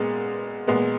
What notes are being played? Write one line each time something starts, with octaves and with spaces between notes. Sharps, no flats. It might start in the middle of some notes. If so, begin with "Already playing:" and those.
Already playing: A#2 G#3 B3
A#2 G#3 B3